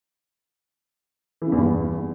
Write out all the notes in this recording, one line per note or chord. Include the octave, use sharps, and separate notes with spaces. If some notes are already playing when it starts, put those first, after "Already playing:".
E3
C#3
E2
G2
E2